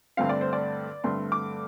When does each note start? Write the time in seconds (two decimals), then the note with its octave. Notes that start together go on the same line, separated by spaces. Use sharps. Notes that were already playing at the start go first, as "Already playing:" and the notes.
0.17 G2 D3 A3 C4 F5
0.29 D5
0.41 C5
0.53 D5
1.03 G2 D3 A3 C4 C6
1.32 D6